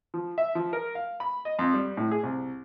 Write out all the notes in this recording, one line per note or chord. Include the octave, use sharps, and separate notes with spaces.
F3
E5
F3
A#4
F5
B5
D#5
F2
G3
A2
G#4
C2